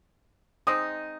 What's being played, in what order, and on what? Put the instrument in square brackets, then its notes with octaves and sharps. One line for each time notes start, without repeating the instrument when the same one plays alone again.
[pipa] G#3 C4 D#4 [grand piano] D#6